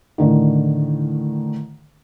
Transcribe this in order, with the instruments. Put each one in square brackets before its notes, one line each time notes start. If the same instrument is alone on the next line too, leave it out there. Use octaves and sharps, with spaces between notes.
[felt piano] A2 D3 D#3